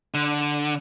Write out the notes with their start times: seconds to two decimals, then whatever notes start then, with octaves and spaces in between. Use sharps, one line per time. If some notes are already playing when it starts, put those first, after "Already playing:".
0.14 D3